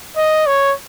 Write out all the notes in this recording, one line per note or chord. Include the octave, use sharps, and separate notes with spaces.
D#5
C#5